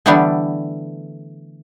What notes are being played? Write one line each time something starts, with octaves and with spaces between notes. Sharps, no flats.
D3 E3 G3 A3 B3 D4